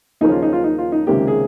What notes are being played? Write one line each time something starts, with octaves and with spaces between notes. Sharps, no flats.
D#2 C#3 F3 A#3 C#4 D#4
F4
D#4
F4
D#4
F4
D#4
C#2 C3 D#3 A#3 C#4 G4
G#4